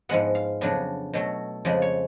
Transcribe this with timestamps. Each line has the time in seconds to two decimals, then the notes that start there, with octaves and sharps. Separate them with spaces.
0.09 G#2 F3 G#3 B3 F#5
0.35 F5
0.61 F2 C#3 F#3 B3 D4
1.13 B2 F#3 A3
1.65 F2 C#3 F3 G#3 D5
1.82 C#5